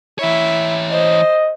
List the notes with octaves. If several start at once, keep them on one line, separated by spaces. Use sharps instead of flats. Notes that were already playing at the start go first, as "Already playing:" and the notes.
E3 E4 C#5 E5
C5 D#5